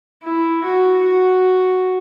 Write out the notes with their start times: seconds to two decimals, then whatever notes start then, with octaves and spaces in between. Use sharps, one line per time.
0.24 E4
0.64 F#4
1.04 F#4